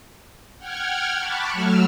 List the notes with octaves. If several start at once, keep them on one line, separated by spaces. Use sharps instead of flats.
F#5 G5 F6 G#6
A5 B5 C#6 D6 F#6
F#3 A3 E6 F6